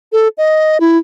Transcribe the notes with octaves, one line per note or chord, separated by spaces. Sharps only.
A4
D#5
E4